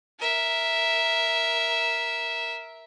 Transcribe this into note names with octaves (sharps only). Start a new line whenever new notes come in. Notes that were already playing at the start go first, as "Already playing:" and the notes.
A#4 E5